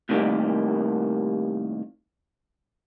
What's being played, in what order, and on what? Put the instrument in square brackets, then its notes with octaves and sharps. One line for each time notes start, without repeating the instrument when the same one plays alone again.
[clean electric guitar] A2 C3 D#3 F#3 G3 A#3